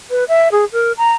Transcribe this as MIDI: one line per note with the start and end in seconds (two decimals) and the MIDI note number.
0.10 0.24 71
0.28 0.48 76
0.51 0.64 68
0.72 0.92 70
0.97 1.14 82